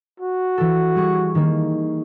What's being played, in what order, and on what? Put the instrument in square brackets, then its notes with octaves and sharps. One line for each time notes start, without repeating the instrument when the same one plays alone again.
[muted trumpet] F#4
[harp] E3 A4
G3 G#4 C#6
D#3 A#3